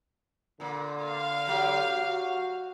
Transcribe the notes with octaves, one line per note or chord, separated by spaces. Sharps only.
A#2 D3 A#3
F5
F#3 G4
F#4